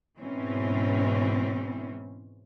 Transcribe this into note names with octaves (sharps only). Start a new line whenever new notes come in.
G#2 B2 E3 C4 C#4